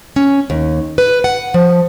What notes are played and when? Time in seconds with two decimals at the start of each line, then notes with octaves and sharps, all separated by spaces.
0.16 C#4
0.50 D#2
0.98 B4
1.24 F#5
1.54 F3